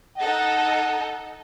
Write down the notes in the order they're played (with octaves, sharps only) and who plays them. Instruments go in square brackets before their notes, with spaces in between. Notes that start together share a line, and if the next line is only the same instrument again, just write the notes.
[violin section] D#4 A4 D#5 [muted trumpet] F#5